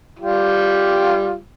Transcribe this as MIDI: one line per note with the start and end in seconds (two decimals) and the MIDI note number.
0.19 1.38 55
0.19 1.38 65
0.19 1.38 67